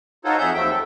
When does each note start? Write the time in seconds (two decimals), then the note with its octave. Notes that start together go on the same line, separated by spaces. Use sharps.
0.25 D#4 F4 F#4 A4 C5 C#5
0.38 F2 G#4 E5 F#5 G6
0.54 D#2 F3 F#3 A3 E5 G5
0.70 A4